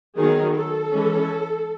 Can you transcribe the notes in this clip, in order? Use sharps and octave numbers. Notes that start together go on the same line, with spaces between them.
D#3 F#3 B3 G#4
A4
E3 G#3 C#4